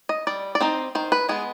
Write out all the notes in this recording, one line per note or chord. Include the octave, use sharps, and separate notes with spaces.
D#5
G3 D5
D5
C4 D#4 C5
D#3 C5
B4
G#3 B3 G#4